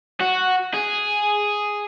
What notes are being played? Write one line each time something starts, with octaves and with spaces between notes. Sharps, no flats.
F#4
G#4